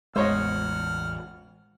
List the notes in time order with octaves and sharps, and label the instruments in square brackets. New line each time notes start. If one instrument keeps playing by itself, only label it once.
[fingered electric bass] A1 E2 [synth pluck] G#3 [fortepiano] C5 C#5 D#5 [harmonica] F#5 F6